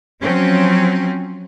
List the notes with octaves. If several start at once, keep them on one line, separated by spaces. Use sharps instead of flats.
F3 F#3 C4 C#4